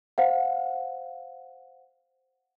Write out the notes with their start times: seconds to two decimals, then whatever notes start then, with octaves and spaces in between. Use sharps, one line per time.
0.18 C5 F5 F#5